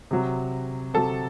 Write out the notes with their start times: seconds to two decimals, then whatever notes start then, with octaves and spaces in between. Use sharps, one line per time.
0.11 C3 F#3
0.94 C3 F#3 A4